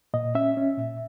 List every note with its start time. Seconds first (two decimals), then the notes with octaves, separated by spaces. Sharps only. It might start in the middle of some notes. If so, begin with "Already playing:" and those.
0.14 A#2 D#5
0.35 C#4 E5
0.57 C#4
0.78 A#2